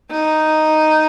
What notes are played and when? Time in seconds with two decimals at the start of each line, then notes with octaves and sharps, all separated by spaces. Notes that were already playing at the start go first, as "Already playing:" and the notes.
0.11 D#4